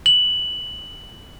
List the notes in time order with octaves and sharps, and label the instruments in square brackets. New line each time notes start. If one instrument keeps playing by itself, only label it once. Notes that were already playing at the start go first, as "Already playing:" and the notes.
[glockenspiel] F#7